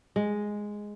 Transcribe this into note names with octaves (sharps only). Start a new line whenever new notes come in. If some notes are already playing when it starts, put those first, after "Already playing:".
G#3